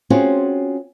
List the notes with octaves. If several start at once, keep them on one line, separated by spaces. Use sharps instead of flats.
C4 C#4 F4 F#4 G#4